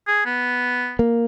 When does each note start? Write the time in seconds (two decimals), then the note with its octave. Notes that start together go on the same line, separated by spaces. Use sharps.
0.07 G#4
0.26 B3
0.99 A#3